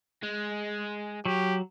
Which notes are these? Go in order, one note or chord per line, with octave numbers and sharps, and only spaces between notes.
G#3
F#3 G4